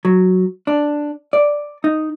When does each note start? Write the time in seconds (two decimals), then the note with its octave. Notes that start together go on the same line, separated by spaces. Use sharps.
0.05 F#3
0.67 D4
1.33 D5
1.84 D#4